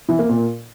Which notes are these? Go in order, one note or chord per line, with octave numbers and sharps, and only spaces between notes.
E3
A#3
A#2